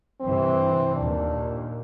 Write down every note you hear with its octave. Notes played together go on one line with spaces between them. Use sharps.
G2 C3 E3 C4
D#2 A#2 D4